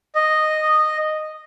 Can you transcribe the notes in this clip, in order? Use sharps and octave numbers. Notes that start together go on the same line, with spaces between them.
D#5